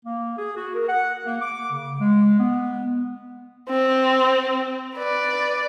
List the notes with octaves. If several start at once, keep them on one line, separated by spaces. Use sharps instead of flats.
A#3
G#4
F#4
A#4
F#5
A#3
D6
C#3
G#3
B3
C4
B4 D5